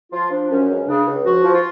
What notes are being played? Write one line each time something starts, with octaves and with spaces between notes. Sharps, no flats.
F3 F4
F3 D4
F#2 C#4
C#2 C#4
C#3 D4
C#2
F3 F#4
F3
F4